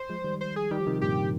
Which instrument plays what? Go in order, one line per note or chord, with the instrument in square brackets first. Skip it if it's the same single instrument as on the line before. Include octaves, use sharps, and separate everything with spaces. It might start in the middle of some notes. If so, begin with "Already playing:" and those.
Already playing: [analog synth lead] C5
[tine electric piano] F3 G#3
D#3 G3
[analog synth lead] C5
G#4
[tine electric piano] D#3 G3 [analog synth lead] G4
[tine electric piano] F3
C3 D#3
[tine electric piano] G2 A#2 [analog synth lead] G4